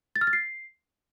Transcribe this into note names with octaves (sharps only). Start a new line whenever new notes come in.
A6
F6
A6
C7